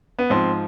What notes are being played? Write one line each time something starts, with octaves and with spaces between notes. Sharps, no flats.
B3
G#2 F3 C4